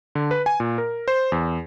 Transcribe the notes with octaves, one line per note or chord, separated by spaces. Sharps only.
D3
B4
G#5
A#2
A#4
C5
E2